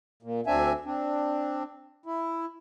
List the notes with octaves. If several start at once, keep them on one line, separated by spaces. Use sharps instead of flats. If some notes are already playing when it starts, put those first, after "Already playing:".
A#2
D2 C4 D4 E5 G#5
C4 D4
E4